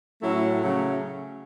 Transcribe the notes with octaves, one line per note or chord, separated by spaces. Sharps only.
A2 F#3 A3 C#4 E4
C#3 F#3 A3